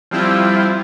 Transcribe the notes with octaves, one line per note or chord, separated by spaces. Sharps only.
F3 G3 C4 E4 F4